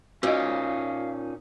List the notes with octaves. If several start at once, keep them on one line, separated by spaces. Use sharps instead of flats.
A#2 C#4 D#4 F#4 D#5 F5